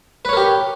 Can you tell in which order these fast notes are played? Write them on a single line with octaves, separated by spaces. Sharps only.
B4 C#5 A#4 G4